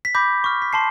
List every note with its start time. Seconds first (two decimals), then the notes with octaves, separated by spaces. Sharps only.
0.05 B6
0.15 B5 D6 G6 A#6
0.44 C#6 F6
0.62 B6
0.73 A5 C6 C7